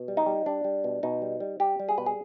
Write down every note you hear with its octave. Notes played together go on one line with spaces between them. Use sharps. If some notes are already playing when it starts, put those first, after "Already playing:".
Already playing: B2
G3
D#4
G3
G3 D4
G3
B2
B2 D#4
G3
G3
G3 G4
G3
G#4
B2 B4
G#4